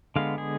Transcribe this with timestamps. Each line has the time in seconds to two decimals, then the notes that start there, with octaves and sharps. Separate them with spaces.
0.16 D3 G#3 B3 F5
0.38 G#4